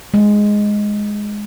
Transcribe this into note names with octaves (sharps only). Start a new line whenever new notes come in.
G#3